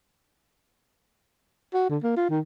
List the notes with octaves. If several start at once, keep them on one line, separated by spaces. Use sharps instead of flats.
F#4
D3
A#3
F4
D#3